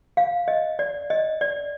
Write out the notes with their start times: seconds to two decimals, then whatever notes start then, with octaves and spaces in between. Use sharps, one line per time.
0.17 F5
0.48 D#5
0.79 D5
1.10 D#5
1.41 D5